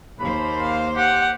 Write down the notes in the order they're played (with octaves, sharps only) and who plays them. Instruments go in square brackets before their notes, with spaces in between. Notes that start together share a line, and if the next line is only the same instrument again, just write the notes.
[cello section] D#2 A#3 C5 [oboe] B5
[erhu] F5
[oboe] G4 [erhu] F#5